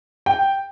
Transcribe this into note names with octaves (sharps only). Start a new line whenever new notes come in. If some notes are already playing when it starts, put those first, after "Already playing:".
G5